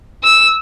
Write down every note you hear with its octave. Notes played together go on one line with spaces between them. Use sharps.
E6